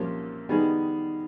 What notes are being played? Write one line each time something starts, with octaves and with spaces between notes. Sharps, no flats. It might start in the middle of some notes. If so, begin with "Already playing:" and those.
Already playing: C2 A#2 F3 A#3 C#4
D#3 G3 B3 D#4 G#4